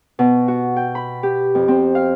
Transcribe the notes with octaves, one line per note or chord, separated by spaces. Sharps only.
B2
F#4
G5
B5
G4
F2
C4
F5